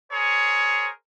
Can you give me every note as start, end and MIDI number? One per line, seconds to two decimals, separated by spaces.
0.11 0.89 68
0.11 0.89 70
0.11 0.89 72
0.11 0.89 73